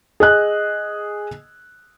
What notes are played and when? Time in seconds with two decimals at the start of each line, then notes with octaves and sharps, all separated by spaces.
0.20 G#4 D#5 F#6